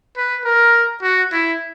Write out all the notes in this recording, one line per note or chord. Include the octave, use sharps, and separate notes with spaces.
B4
A#4
F#4
E4